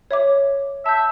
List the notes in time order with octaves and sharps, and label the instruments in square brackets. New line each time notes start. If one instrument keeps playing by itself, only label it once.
[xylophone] C#5 E5 D6
[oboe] E5 [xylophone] A5 G6